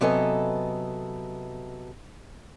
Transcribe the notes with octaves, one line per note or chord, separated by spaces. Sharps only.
C3 F#3 B3 A4 D#5 G#5